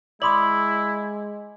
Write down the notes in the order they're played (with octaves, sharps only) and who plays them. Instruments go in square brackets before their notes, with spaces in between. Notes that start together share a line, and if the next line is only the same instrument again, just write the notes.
[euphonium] G#3 [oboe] E4 [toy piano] D5 B5 D#6 [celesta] C6 D6 F#7